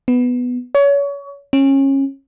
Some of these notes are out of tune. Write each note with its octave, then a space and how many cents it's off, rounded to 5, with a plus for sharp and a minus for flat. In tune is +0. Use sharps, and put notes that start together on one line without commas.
B3 +5
C#5 +30
C#4 -25